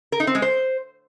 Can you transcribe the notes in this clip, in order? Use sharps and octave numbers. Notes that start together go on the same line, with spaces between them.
A#4
D#4
C4
G#3
C5